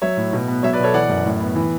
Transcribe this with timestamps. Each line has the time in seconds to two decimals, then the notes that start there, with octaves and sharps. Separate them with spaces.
0.02 F#3 C#5 E5
0.17 A2
0.33 B2
0.48 B3
0.63 F#3 C#5 E5
0.73 B4 D5
0.79 B2 A4 C#5
0.94 E3 D5 F#5
1.09 F#2
1.26 A2
1.40 B3
1.56 E3